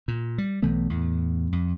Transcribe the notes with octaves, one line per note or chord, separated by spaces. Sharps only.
A#2
G3
B1 E3 A3 B3
E2 A2
F2